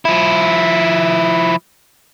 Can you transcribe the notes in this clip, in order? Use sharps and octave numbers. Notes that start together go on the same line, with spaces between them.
F3 E4